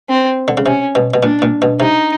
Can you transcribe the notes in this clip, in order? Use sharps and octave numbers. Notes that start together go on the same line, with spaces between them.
C4
D3
C#3
C3 C#4
B2
B2
A#2 D4
A#2
B2
C3 D#4